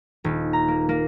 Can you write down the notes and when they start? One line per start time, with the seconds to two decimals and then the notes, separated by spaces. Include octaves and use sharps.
0.24 D#1
0.53 A#5
0.68 A#3
0.89 A#3